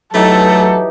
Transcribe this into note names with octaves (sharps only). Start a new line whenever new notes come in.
E3 F#3 A3 D#4 G4 A4